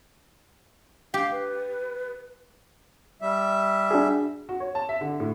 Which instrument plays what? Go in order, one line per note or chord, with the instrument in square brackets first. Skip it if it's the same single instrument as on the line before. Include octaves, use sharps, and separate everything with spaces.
[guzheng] G4 [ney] F5
[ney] B4
[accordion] G3 E5
[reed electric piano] D4 F#4 G#4
[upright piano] F#4
C#5
A5
E5
D3
A2